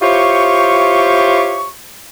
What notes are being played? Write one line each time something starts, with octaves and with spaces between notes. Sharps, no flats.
E4 F4 G4 C5 C#5 C#6